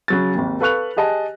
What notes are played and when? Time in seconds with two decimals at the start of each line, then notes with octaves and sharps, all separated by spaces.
0.08 C#3 F#3 A6
0.35 G#1 D#2
0.61 A4 B4 F5 C#6 F#6 F7
0.97 G4 G#4 D#5 A5